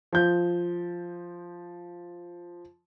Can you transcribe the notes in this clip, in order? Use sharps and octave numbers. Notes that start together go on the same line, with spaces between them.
F3 G6